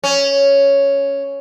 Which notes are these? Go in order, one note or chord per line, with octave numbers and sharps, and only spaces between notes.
C#4